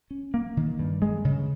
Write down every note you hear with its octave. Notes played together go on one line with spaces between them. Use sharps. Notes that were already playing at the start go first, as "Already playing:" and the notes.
C#4
A#3
D#3
G2
G#3
C#3